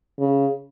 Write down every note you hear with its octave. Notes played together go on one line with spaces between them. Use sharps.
C#3